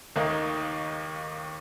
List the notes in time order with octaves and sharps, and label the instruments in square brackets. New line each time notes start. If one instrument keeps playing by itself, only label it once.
[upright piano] D#2 D#3 A#3 D#4